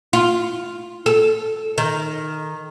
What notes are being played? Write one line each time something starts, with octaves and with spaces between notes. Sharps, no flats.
F4
A4
D#3